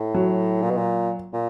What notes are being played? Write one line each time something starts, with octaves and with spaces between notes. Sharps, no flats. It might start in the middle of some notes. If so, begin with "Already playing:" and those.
Already playing: A2
F#3
A#2
B2
A#2
A#2